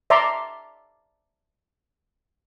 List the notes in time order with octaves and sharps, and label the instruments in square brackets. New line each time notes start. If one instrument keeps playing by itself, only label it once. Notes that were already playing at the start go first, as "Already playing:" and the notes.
[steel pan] D5 E5 A5 A#5 C6 D6